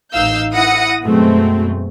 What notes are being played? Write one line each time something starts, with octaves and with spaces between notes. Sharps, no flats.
A1 D#4 F5 E6 G6
E4 F#5 D#6 A#6 C#7
F#2 B2 G#3 A3 C4